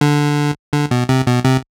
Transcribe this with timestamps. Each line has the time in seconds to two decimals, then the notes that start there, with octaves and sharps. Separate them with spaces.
0.01 D3
0.73 D3
0.91 B2
1.09 C3
1.27 B2
1.45 C3